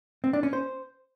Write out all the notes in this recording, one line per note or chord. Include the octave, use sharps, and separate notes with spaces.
C4
D4
C#4
C5